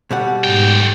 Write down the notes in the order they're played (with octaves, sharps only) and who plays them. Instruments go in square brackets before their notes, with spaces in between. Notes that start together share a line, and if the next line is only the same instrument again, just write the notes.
[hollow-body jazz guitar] B2 G3 F#5
[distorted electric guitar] B1 G5 [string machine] G#2